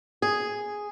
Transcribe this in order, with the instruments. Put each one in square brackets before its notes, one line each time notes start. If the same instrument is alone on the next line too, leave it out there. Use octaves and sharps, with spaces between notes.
[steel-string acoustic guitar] G#4